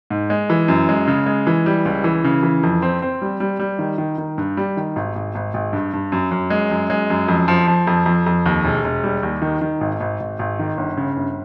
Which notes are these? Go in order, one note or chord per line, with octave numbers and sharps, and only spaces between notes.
G#2
G#3
E3
F#2
G#3
C#3
G#3
E3
G3
C#2
E3
C#3
E3
F2
C4
C4
G3
G3
G3
D#3
D#3
D#3
G2
G3
D#3
G#1
G#1
G#1
G#1
G2
G2
F#2
F#2
G#3
F#2
G#3
F#2
F2
F3
F3
F2
F2
F2
D#2
E1
E1
G3
D#2
D#3
D#3
G#1
G#1
G#1
G#1
D#3
G1
C#3
G1